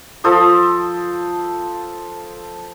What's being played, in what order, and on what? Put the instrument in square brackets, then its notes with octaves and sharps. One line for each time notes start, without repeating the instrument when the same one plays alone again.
[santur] F3 A4 C5 D#6